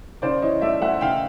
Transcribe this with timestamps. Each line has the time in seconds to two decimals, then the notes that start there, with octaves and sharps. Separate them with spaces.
0.22 C#3 C5 D5
0.42 E3 C#5 D#5
0.61 A3 D5 E5
0.81 A3 E5 F#5
1.01 C#3 F5 G5